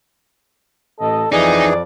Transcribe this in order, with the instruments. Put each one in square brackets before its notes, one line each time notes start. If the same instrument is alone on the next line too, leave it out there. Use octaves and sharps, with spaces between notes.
[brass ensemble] A1 D#5 [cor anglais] A4
[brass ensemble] F2 [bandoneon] E3 G#4 [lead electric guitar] D#4 [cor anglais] D5